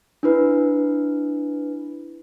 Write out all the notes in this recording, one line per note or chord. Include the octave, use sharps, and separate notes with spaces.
D4 E4 B4